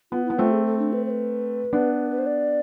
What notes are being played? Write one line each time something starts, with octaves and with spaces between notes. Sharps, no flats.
B3 F4
B3 E4
A3 C4 F4
G#4
A4
D4
B4
C5
B4
B3 D4
B4
C5
D5